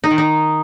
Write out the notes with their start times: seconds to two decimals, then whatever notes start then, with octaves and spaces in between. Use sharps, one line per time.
0.04 D#4
0.11 D#3
0.18 D#4